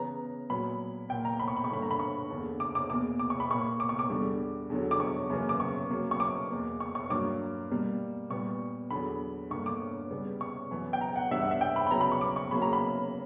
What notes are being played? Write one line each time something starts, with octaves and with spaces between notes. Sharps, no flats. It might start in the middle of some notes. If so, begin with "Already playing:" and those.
Already playing: C#3 E3 B3 A#5
A#2 F#3 B3 B5
A#2 A#3 G5
A#5
B5
C#6
B5
C#6
G2 D3 A#3 B5
A#5
B5
C#6
E2 D3 A#3
D6
D6
E2 B2 A#3 D6
D6
C#6
B5
A#2 A#3 C#6
D6
C#6
D6
E2 D3 G3
E2 D3 F#3
D6
C#6
F#2 C#3 E3 A#3
D6
C#6
C#3 F#3 A#3
C#6
D6
E2 B2 A#3
C#6
C#6
G2 F#3 A#3 D6
B2 G3 A#3
A#2 G3 B3 C#6
E2 D3 F#3 B5
G2 D3 A#3 C#6
D6
C#3 G3 B3
C#6
F#2 E3 B3
G5
A#5
F#5
G2 E3 G3 B3 E5
F#5
E5
G5
B5
B5
C#3 F#3 B3 A#5
B5
C#6
D6
C#6
C#3 F#3 A#3 B5
A#5
B5